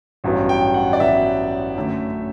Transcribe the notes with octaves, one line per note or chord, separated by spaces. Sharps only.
A1 G2 F#3 B3
G5
F#5
D5
A1 G2 F#3 B3 E5
F#2 D3 A3